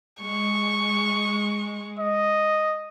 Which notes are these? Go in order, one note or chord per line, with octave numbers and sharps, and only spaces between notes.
G#3 C#6
D#5